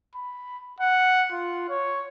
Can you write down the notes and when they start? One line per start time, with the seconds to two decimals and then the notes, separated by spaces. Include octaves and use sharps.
0.15 B5
0.80 F#5
1.32 F4
1.69 C#5